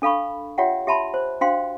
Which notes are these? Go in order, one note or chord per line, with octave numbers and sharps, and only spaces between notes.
D4 A4 F5 B5 C#6
F4 G4 C#5 E5 F#5 G5
G4 E5 A5 B5 C6
C5
D4 F#4 C5 F5 G5 C6